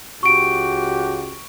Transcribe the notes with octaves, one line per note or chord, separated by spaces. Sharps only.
C#2 F#4 G4 C#6 D7